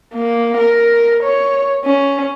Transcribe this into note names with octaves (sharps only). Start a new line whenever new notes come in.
A#3
A#4
C#5
C#4